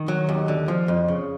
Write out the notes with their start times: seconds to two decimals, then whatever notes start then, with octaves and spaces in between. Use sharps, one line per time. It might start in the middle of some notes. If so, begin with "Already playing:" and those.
Already playing: D#3
0.08 F#3
0.29 D#2
0.48 D3
0.68 F3
0.88 F2
1.08 C#3